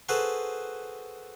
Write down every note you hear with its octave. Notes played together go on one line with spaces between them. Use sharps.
F#4 G#4 A4 B4 C5